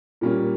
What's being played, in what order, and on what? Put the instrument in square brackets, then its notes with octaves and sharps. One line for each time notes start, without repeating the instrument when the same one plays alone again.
[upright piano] A#2 G3 A#3 C#4